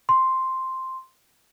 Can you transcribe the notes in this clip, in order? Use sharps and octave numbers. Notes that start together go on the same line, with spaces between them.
C6